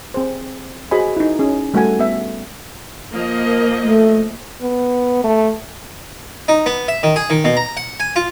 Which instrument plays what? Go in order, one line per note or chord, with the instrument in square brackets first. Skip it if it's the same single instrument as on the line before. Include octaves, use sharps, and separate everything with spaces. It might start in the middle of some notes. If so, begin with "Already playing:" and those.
[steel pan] C4 G#4 C5
F#4 G#4 C5 D#5 G#5 B5
D#4 E4
C#4 G#4
G3 A3 F#4 A4 F#5 G#5
B3 E5
[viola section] F3 A#3 D#5
[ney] A#4
A3
[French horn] B3
A3
[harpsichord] D#4
B3
E5
D#3
G#4
D#3
B2
A#5
F#5
G#5
F4